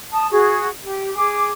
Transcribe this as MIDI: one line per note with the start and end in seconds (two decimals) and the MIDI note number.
0.12 0.26 81
0.12 0.26 87
0.31 0.67 66
0.31 0.67 68
0.83 1.11 67
1.14 1.48 68
1.14 1.48 86